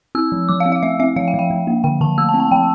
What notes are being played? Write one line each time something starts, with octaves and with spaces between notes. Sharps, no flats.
C4 E6
F3
F3 D6
F5
C4
F5
A3 E5
C4 E5
F3 F5
G5
F3
G5
F3
A#3
D3 G5
D3 A5
A3 E6
A5
C4
A5
F3 G5